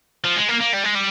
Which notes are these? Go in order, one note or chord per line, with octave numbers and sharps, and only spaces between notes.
F3
G#3
A#3
A#3
G3
G#3
G3